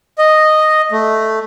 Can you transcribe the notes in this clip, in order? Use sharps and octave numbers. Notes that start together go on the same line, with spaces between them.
D#5
A3